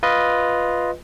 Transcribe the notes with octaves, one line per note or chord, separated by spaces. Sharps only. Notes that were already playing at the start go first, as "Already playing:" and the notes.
F4 B4 D#5